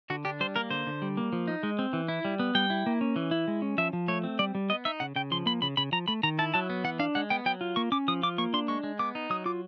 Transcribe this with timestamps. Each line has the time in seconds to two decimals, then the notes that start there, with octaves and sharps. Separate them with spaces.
0.10 D3 F#4
0.25 D4 G4
0.40 G3 C5
0.56 A#3 A#4
0.70 D3 C5
0.87 D3
1.02 G3
1.17 A#3
1.33 F3
1.48 D#4
1.63 G#3
1.79 C4
1.93 E3
2.08 E4
2.25 G3
2.40 B3
2.55 G3 G5
2.70 E4
2.86 A#3
3.01 C#4
3.16 E3
3.31 E4
3.48 G#3
3.62 C#4
3.78 F3 E5
3.93 F3
4.08 A3 C#5
4.24 C4
4.39 G3 D5
4.55 G3
4.70 B3 D#5
4.85 D#4 E5
5.00 C#3 F#5
5.16 C#3 G5
5.31 F3 C6
5.46 A#3 B5
5.62 C#3 B5
5.77 C#3 B5
5.92 F3 A#5
6.08 A3 B5
6.23 D#3 A#5
6.39 E4 A5
6.54 F#3 A5
6.70 B3
6.84 E3 F#5
6.99 D4 F5
7.15 G#3 F#5
7.30 B3 G5
7.46 F#3 G5
7.61 F4
7.76 A#3 C#6
7.92 C#4 D6
8.08 F3 D#6
8.23 F4 D6
8.38 A#3 C#6
8.53 D4 C6
8.68 G#3 C#6
8.84 G#3
8.99 B3 D6
9.15 D#4
9.30 F#3 D#6
9.46 F4 D6